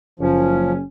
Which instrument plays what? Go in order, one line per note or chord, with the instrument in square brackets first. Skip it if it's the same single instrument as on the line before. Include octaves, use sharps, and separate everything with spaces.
[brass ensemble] F#1 [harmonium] F3 [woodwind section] C#4